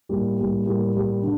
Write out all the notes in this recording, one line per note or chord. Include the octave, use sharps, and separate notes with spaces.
A2 G3 A#3
A2 G3 A#3
A2 G3 A#3
A2 G3 A#3
D3